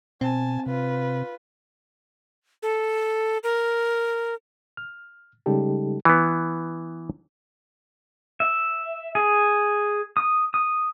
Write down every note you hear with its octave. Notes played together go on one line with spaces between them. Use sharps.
B2 C4 G#5 A5
C3 F4 B4
A4
A#4
F6
C#3 G3 G#3 D#4 G4 A4
E3 B3
E5
G#4
D#6
D#6